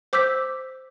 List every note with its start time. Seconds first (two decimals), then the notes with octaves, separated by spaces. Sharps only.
0.13 C5 D6 E6 G6 B6